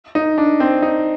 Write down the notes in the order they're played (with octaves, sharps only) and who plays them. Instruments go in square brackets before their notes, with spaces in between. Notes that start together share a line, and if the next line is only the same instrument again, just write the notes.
[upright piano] D#4
D4
C4
D#4